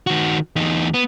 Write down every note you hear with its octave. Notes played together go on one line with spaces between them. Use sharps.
D#3 F#4
E2 D#4
B3